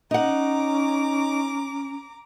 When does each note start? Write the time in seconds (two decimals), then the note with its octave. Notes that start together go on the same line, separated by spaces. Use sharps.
0.11 C#4 D#4 F#5 A#5 D6